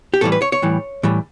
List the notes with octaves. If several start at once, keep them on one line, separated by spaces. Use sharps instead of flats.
G4
A2 E3 G3 A4
B4
C#5
C#5
A2 E3 G3
A2 E3 G3